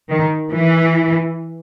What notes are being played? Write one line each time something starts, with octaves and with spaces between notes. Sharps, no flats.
D#3
E3